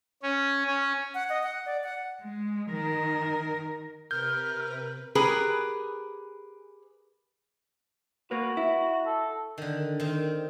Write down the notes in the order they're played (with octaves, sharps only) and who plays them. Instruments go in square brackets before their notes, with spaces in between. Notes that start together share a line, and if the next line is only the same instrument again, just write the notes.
[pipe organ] C#4
C#4
[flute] F#5
D#5
F#5
D5
F#5
[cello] G#3
D#3 A#4
[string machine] C3 B4 [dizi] A#4 [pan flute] F6 [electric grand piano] G6
[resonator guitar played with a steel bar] G4 G#4 A#4 B4
[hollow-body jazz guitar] A#3 A#4 B4 [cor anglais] F#4
[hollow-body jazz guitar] E4
[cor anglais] A4
[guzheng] D3 D#3
D#3 C4